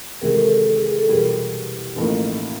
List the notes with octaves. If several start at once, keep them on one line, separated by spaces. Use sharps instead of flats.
E2 C3 D#3 G#3 G#4 A#4
A4
A4
A4
A4
G#4
G#4
A4
E2 B2 G3 G#4 A#4
A1 A2 F3 A#3 D#4